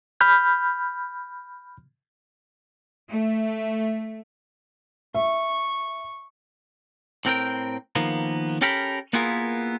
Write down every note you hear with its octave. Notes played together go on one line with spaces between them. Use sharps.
B5 F6 G6
A3
E5 C#6
A2 C4 A#4 G5
D#3 F3 A#3 B3
C#4 G4 A4 A#4 G5 B5
A#3 B3 E4 F4 G#4 A#4